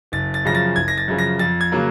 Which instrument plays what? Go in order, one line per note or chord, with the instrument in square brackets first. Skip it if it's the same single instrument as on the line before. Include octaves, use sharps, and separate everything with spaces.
[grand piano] F#1 A6
A6
F#2 C#3 F3 A#6
A6
F#1 G#6
A#6
A6
F#2 C#3 F3
A#6
F2 A6
G#6
C#3 F#3 A#3